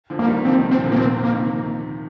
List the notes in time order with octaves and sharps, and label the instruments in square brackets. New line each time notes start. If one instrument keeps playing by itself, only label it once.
[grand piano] D3 F3
[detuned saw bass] A#3
[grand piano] D#3 G3
[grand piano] D3 F3 [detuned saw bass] C4
[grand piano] C3 D#3
[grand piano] A#2 D3 [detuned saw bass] C4
[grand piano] D3 F3
[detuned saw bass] A#3
[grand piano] C3 D#3 [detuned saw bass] C4
[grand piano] C3 D#3
[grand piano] F3 [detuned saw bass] A#3
[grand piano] C3 D#3